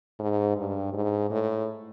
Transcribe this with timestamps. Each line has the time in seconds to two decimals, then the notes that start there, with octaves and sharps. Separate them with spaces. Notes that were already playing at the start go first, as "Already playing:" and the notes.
0.19 G#2
0.56 G2
0.94 G#2
1.31 A2